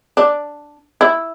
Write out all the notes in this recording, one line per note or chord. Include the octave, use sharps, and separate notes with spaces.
D4
E4